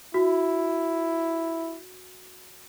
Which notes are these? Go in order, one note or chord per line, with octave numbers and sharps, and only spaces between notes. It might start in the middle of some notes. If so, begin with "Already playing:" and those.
E4 F#4